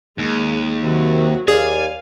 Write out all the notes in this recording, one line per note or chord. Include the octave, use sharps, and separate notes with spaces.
D#2 G#3
C3 D#3 F#3 F#4
D#2 G#4 D5 F5 G#5